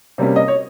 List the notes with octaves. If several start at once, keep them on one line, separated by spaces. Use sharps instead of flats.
C3 G3 A#3 C#4
D#5
C#5